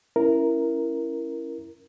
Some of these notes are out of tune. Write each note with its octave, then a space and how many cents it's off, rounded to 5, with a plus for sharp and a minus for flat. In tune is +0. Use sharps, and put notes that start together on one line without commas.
C#4 +0 E4 +10 A#4 +0